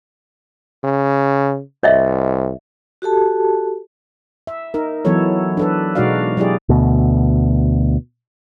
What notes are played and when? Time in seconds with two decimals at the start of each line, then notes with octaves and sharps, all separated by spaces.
0.84 C#3
1.83 C2 C#5 D#5 E5
3.02 F#4 G4 A4 A5
4.47 E5
4.74 D#4 A#4
5.05 E3 F#3 B3 E4 A4 C#5
5.57 D4 A4 B4
5.95 B2 G#3 D#4 F#4 D5 F5
6.37 F#3 E4 G4 G#4 D5
6.69 D2 B2